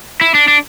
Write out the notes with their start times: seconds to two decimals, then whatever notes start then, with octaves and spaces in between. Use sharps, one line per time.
0.21 E4
0.35 D4
0.48 D4